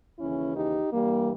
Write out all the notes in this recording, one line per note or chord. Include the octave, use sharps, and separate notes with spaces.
D#2 C#3 E3 C#4 E4
D#4 G4
G2 E3 G3 A#3